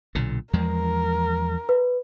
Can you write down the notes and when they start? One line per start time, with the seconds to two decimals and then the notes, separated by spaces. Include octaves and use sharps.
0.15 B1 A#2 D3
0.53 E2 F3 G#3 A#4
1.69 B4